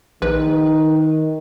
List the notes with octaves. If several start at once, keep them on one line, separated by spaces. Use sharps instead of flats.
A#1 D#3 B4